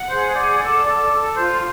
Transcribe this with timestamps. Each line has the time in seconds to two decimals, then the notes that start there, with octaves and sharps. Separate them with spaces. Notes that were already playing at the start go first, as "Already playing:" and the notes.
Already playing: F#5
0.10 G#4 C5
0.35 D5 F#5
0.61 A4 D5
0.86 A4 D5
1.11 A4
1.37 F4 C5